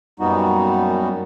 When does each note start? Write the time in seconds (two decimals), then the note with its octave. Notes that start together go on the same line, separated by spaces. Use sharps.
0.20 F#2 A#2 G3 B3 D#4 F#4